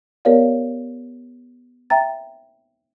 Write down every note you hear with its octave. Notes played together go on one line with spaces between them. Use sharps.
B3 G4 A#4 C#5 D5 F5
E5 G5 A#5 A6